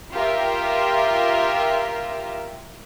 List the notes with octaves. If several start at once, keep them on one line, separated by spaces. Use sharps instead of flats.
F4 G4 A#4 E5